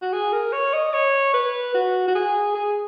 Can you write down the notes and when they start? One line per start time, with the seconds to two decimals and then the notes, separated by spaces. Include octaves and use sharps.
0.02 F#4
0.13 G#4
0.33 A#4
0.53 C#5
0.73 D#5
0.93 C#5
1.34 B4
1.74 F#4
2.08 F#4
2.15 G#4
2.55 G#4